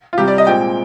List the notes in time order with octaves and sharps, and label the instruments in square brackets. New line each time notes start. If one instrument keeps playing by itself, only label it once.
[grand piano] F4
C2 C3 G3 G4
D5
D#5
A#2 G#3 C4 G5